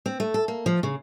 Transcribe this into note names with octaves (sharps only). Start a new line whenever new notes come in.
C4
A3
A4
A#3
F3
C#3